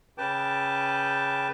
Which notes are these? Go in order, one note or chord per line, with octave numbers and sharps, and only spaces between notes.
C#3 B4 G5 A5 D6